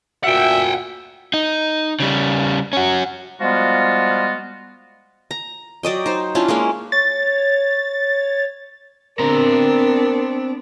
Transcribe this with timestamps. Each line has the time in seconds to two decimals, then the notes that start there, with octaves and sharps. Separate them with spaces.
0.24 D2 A#2 F#4 E5 F#5 G5
1.34 D#4
2.00 C#3 G3
2.73 C#4 F#4
3.40 F3 G3 G#3 B3 F4 F#4
5.31 A#5
5.83 F#3 D5 D#5 G5
6.06 D#4 C5
6.35 C#4 D4 E4 F4
6.48 G#3 A#3 C#4
6.92 C#5 A6
9.19 B3 C4 D4 A#4 A#5